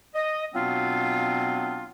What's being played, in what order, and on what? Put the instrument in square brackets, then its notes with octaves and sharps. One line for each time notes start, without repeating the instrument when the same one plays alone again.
[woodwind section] D#5
B2 F#3 B3 C4 D4 F4